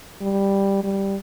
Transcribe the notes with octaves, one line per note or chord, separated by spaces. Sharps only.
G3
G3